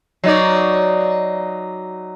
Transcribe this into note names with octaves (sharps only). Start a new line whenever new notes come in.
F#3 D#4 D5